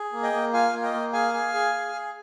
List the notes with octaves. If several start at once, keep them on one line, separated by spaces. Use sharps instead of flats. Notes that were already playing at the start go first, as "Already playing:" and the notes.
Already playing: G#4
A#3
D#5 G5
A#3
F4 F5 G#5
A#3
D#5 G5
A#3
G#4 F5 G#5
G#4
G#4
G#4
G#4